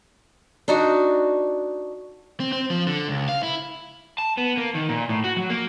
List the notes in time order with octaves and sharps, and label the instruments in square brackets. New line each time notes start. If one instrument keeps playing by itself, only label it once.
[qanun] D4 D#4 F#4
[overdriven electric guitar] C4
C4
F3
D3
C#2
F5
E4
A5
B3
A#3
D#3
A#2
A2
F#4
F#3
A#3